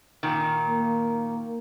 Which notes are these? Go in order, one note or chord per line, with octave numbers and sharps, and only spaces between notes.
A#2 D#3
A#3